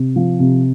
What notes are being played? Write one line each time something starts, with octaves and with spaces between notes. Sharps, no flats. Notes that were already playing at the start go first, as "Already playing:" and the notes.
Already playing: C3
F3
C3